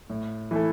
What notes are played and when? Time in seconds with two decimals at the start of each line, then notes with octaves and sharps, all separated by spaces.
0.10 A2
0.51 E3 A3 E4 A4